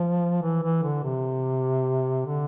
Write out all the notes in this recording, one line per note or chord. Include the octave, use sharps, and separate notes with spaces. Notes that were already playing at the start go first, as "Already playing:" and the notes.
Already playing: F3
E3
E3
D3
C3
D3